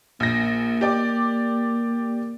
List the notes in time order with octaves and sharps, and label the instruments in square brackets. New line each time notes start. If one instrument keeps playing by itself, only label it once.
[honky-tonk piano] A#1 A#6 [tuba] A#3
[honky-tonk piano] G4 D5 D6